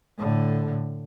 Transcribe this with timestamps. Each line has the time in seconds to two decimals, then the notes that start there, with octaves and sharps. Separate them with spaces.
0.18 A2 D3